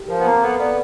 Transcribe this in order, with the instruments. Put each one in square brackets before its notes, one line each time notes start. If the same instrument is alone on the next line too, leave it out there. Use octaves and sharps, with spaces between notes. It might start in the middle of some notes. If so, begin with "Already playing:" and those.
Already playing: [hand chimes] G4
[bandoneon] F3 [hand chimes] A#4
[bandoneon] B3
[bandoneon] A#3 [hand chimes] C4
[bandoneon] B3 [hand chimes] A4
[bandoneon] B3 [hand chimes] D5